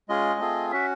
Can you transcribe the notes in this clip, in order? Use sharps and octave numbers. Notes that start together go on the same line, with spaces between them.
G#3 C#4 F4 G#4 D#5
A3 C4 F4 G#4
C#4 F#4 E5